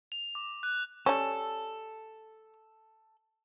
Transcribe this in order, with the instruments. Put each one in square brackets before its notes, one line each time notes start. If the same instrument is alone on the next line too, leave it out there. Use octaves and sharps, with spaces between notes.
[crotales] F7
D6
F#6
[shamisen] G3 C#4 [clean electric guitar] A4